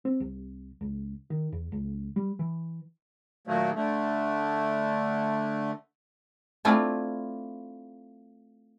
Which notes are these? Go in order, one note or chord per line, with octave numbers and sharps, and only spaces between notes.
C4
C2
C#2
D#3
E2
C#2
G3
E3
A#2 D#3 F#3 A3 A#3
D3 A3
A3 C4 D4 E4 F4